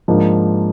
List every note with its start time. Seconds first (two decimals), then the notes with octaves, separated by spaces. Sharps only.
0.08 G#2 F3 A#3 D4